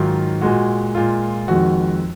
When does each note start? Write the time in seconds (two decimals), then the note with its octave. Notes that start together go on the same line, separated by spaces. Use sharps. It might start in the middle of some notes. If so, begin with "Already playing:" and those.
Already playing: G#2 D#3 F#3 F4
0.41 A#2 G#3 F#4
0.95 A#2 G#3 F4
1.48 F2 D#3 G#3 F#4